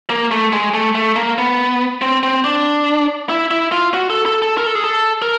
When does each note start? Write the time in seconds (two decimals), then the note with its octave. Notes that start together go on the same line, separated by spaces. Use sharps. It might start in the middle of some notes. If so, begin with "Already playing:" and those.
0.10 A#3
0.31 A3
0.53 G#3
0.74 A3
0.95 A3
1.16 A#3
1.38 B3
2.02 C4
2.23 C4
2.44 D4
3.29 E4
3.51 E4
3.72 F4
3.94 F#4
4.10 A4
4.26 A4
4.42 A4
4.58 A#4
4.66 A4
4.75 G#4
4.84 A4
5.22 A#4